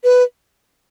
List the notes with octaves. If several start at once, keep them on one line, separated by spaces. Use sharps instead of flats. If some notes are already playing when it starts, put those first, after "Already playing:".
B4